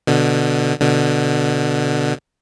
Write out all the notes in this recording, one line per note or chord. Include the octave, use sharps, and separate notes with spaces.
B2 D3
B2 D3